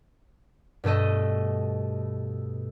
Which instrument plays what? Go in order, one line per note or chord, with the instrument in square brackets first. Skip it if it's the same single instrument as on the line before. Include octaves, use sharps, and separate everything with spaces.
[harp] G2 B2 A3 A4 D#5